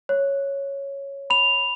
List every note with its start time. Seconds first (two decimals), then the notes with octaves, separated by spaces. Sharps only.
0.09 C#5
1.30 B5 F7